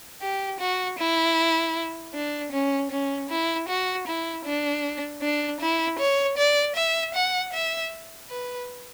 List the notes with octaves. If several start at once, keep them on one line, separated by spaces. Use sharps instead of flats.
G4
F#4
E4
D4
C#4
C#4
E4
F#4
E4
D4
D4
E4
C#5
D5
E5
F#5
E5
B4